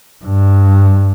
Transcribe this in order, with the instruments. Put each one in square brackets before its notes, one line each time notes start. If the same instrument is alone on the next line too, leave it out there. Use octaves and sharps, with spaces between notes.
[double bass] G2